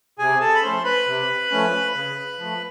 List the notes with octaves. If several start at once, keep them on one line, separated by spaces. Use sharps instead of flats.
C3 G#4 G#5
A4 A5
B5
F3 A3 C#4 C5 C6
B4 B5
C3
F3 A3 C#4
C#3
F3 A3